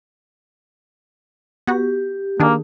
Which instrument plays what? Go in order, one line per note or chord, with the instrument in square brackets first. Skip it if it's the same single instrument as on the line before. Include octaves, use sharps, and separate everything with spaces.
[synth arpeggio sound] B3 F#4 [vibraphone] G4
[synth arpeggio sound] D#3 D4 G#4 [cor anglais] A#3